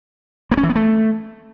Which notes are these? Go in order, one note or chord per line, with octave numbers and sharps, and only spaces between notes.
A#3
C#4
E3
B3
A3